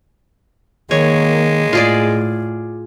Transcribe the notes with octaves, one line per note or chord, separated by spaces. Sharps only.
D#3 G#3 A#3 C#5
A2 F4 G#4 D5